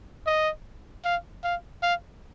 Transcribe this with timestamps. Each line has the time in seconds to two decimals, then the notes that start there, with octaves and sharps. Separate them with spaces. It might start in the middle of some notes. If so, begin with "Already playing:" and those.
0.27 D#5
1.05 F5
1.44 F5
1.83 F5